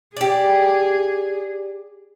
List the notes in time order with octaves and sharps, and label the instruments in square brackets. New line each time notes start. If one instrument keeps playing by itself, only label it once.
[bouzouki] G4 D5 [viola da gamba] G#4